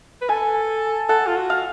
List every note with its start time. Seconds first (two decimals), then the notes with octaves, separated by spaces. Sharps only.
0.21 B4
0.29 A4 G#5
1.09 A4 F#5
1.27 F4
1.36 F#4
1.50 F5